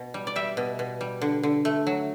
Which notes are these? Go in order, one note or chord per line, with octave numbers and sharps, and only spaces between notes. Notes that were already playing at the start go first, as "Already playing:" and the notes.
Already playing: B2
G3
D5
G3 E5
B2
B2
G3
D3
D3
A3
F#3